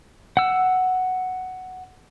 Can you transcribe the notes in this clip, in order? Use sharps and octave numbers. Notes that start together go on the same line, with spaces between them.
F#5 E6